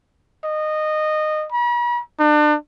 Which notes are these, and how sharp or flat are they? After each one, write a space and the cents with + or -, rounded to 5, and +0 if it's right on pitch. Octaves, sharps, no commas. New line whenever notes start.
D#5 -15
B5 -45
D4 +35